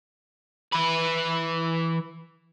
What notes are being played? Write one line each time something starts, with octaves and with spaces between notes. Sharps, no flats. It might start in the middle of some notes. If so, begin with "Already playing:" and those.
E3 B4